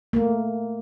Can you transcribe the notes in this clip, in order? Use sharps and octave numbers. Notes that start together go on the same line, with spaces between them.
A3 A#3